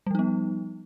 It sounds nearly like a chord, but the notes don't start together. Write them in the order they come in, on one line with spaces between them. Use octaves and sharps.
G3 F3 D#4 B3